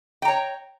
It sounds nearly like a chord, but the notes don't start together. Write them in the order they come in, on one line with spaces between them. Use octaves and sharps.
G5 A#5 C#5